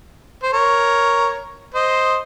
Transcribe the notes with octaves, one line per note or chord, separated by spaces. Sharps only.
C5
A#4 C#5
C5 D#5